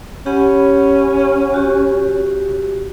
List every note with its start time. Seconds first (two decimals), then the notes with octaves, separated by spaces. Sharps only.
0.26 C#4 G4 F#5 B5
1.54 F#4 G4